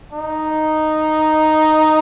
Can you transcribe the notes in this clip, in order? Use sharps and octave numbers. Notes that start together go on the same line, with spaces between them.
D#4